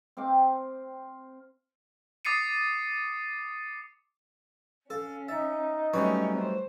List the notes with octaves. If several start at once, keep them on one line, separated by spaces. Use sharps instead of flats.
C4 F5 G5 D6
D6 D#6 A6 C7 C#7 D#7
C#4 A4 F5
D#4 E5 A6
F#3 G3 A3 C#4 B4 C#5
C5